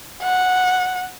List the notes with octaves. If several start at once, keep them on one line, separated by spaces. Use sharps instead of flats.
F#5